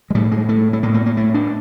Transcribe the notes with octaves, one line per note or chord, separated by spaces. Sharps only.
G#3
A2 G3
G#3
A3
A3
A2 A#3
A#3
A#3
A3
D4